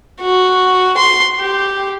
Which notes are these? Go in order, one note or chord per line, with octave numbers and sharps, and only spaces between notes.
F#4
C6
G4